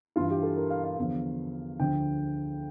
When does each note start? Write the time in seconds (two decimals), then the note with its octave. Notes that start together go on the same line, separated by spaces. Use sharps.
0.16 G2 E3 F4
0.30 G4
0.43 A4
0.56 A#4
0.70 F5
0.84 F5
0.98 E2 D3 F3
1.79 D2 D3 F3 G5